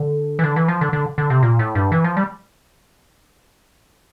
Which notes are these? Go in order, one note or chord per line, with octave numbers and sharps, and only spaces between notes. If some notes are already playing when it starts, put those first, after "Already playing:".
Already playing: D3
E3
D3
E3
F3
D3
D3
D3
C3
A#2
A2
G2
E3
F3
G3